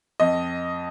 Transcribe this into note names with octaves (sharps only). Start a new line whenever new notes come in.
F2 D#5